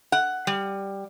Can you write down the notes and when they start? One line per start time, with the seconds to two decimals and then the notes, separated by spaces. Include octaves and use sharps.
0.12 F#5
0.47 G3